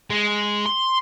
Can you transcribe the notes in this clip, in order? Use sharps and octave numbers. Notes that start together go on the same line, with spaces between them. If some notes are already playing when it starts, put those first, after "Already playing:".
G#3
C6